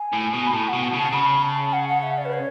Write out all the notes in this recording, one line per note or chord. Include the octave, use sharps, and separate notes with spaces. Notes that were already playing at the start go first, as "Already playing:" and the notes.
Already playing: G#5
A2
B2
B5
A2 A5
B2 F#5
A5
C#3 A5
C#3 B5
A5
F#5
F#5
E5
D5
B4
C#5